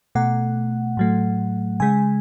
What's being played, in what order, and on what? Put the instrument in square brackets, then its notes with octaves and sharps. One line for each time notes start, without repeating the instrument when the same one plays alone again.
[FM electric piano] B2 A3 F#5
A2 F#3 A3
C#3 G#3 G#5